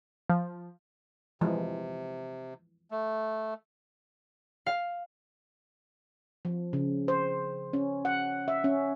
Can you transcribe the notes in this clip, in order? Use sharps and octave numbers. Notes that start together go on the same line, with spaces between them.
F3
C3 E3 F3 G#3
A3
F5
F3
C#3
C5
C#4
F#5
E5
C#4